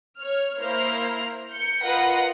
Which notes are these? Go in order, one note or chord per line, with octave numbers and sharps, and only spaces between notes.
C#5 F6
A#3 E4 C5 A#5 F6
G6 C#7
F4 A#4 B4 D#5 F#5